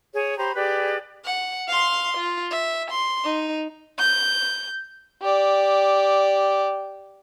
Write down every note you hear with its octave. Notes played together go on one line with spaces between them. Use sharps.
G#4 C#5
G4 C5 A#5 B5
G4 G#4 B4 D5
F#5
F5 C6
F4
E5
C6
D#4
G6
G4 D5